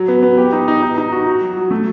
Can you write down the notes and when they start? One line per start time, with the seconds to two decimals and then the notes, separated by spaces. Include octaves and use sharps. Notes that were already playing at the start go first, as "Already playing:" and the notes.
Already playing: F#3
0.08 B3
0.23 B3
0.38 G4
0.52 D#4
0.68 D#4
0.82 D#4
0.98 D#4
1.12 F#4
1.27 F#4
1.41 F#3
1.57 F#3
1.71 A3